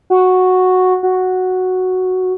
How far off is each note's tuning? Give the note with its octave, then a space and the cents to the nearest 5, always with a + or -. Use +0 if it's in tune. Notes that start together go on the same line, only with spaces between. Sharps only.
F#4 -5
F#4 +0